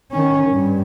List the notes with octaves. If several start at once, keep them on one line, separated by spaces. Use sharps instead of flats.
D#3 C#4
G2